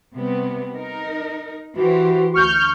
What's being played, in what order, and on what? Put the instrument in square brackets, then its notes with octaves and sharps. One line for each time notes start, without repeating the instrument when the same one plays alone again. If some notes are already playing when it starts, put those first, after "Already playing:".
[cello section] C3 G3 B3
D#4 A#4
[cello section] E3 G4 C5 [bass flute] F#4
[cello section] D2 [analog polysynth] C#6 F6 G6